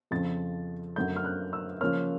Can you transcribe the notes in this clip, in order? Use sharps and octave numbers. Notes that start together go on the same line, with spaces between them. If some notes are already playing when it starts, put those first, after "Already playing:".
F2 C#3 F3 A6
F#2 D3 F#3 A3 G6
F6
F#6
E6
C#3 F3 A#3 C#4 F6